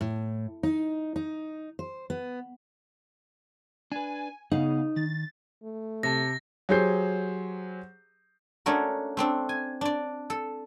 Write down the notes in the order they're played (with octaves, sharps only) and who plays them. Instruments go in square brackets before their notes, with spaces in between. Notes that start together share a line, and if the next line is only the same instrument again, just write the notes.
[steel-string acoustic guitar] A2
D#4
D#4
C5
B3
[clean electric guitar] D4 B4 [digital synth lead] G#5
[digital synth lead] C#3 [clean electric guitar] B3 F5 F#5 [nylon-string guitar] D#4
[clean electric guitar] D#3 [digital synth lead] A6
[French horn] A3
[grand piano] C3 A5 [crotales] A#6
[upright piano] F#3 G4 G#4 C5 G6 C7
[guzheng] A3 C#4 D4 F#4 A#4
A3 C4 D4
G#5
D4 D5
A4